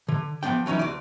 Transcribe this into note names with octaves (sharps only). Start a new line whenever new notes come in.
D3
F3 F#3 B3 D4 G5
E3 F#3 C#4 D#4 E4
D2 D5